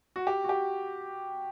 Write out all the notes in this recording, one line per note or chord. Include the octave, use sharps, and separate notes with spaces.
F#4
G4
F#4
G4